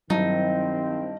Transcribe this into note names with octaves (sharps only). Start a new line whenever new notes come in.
G2 D#3 F#3 C4 D#4 E4 A5